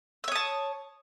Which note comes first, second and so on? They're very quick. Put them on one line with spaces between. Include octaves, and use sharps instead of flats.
E6 C#5 D#6 A5